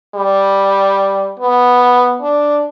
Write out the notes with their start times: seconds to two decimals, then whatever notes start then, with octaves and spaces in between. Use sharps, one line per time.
0.15 G3
1.39 B3
2.22 D4